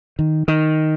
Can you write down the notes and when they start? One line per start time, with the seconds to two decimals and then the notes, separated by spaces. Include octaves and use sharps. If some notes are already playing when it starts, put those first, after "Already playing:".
0.19 D#3
0.48 D#3